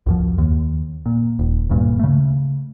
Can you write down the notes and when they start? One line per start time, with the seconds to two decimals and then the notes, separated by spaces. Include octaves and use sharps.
0.06 C#2 F#2 F3
0.38 D#2
1.06 A#2
1.39 D#1
1.70 E1 D2 G2 A#2
1.99 C#3 A3